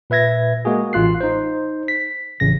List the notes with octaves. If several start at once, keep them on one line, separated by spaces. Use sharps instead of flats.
A#2 B4 E5 G#6 A#6
G#3 A#3 F#4 G#4
A1 F4 F#6 C7
D#4 C5
B6
A1 C#3 A#6